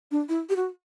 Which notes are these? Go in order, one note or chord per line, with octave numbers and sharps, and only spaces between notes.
D4
E4
G4
F#4